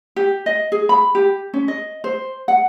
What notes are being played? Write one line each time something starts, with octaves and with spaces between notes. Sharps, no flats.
G4
D#5
G#4
B5
G4
C#4
D#5
C5
F#5